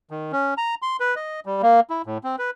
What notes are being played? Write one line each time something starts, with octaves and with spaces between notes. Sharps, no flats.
D#3
C#4
A#5
C6
B4
D#5
G3
A#3
E4
A2
C4
B4